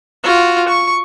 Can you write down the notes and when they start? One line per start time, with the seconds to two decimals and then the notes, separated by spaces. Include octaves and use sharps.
0.23 F4 F#4
0.68 C#6